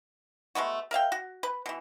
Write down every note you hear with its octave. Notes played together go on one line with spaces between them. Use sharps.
G#3 A3 B3 F#4
A#4 E5 F5 G5
F#4
B4
B2 E3